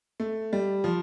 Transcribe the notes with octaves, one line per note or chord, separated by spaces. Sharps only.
A3
G3
F3